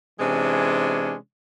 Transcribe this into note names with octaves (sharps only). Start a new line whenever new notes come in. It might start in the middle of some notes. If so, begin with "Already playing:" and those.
C3 E3 G#3 C#4 D4